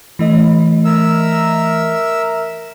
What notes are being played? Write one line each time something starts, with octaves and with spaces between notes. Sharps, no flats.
E3 A3 D#5
A#4 E5 E6